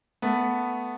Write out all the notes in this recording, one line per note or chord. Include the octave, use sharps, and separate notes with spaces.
A3 B3